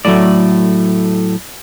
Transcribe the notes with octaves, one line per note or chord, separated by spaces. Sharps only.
A2 F#3 A3 D5